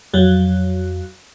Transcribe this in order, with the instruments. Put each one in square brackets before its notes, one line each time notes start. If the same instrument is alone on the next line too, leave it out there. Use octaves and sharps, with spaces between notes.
[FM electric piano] F2 F#3